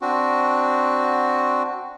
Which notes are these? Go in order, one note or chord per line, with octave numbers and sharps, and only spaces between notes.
C4 D4 F#4